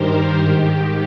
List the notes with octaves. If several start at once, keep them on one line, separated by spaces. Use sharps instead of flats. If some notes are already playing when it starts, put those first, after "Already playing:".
Already playing: G2 D#3 G4 A#4 C5
G#2 D#3